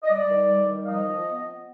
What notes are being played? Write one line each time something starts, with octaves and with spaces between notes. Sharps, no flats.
D#5
G3 D5
D#3
G3
D#3
F5
F3 D#5
F3
B3
B3